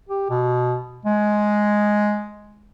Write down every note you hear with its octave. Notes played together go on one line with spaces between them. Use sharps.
G4
B2
G#3